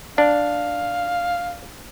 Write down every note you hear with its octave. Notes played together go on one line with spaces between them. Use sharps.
D4 F5